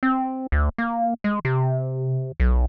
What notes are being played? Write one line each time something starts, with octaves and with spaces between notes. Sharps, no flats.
C4
D2
A#3
G#3
C3
B1